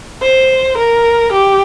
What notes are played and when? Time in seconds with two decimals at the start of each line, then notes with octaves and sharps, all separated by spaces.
0.22 C5
0.77 A#4
1.32 G4